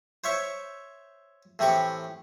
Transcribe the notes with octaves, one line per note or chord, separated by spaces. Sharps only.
C5 C#5 E5 C#6
A2 E3 C4 G4 C#6 D6